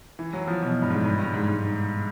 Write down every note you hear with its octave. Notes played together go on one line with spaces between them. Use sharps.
E3
F#3
F3
B2
G2
G#2
G2
G2
G#2
G#2